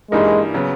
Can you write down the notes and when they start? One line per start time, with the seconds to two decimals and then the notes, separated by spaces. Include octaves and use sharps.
0.11 G2 E3 G3 G#3 A#3 D#4
0.54 C#3 F#3 B3